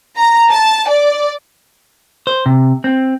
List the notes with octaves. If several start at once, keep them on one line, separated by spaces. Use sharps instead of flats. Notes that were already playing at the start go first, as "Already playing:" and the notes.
A#5
A5
D5
C5
C3
C4